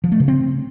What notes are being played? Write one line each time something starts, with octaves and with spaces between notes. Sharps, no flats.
F3
A3
C#3
C4